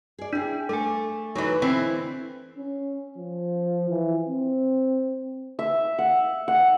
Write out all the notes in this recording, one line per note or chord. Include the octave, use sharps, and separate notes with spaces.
G#4 D5
D4 E4 G#4
A3 A4 G#5
E3 F#3 D#4 F4 B4
D3 E3 C4 E4
C#4
F3
E3
C4
E5
F#5
F#5